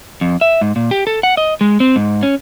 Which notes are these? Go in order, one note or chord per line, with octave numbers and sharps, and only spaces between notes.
F2
E5
G#2
A#2
G4
A4
F#5
D#5
G#3
C4
G#2
C#4